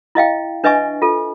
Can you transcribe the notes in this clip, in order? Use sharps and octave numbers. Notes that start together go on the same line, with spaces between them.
E4 D#5 F5 G5
D4 B4 D#5 E5 G#5 C#6
F4 A4